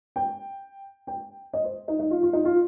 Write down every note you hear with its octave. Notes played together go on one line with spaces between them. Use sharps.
G5
G5
D#5
C5
D#4
D#4
F4
F4
D#4
F4